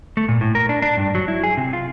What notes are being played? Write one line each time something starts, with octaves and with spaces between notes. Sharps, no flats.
A3
A#2
A2
A#4
D4
D4
G2
F#3
E4
G#4
C3
F4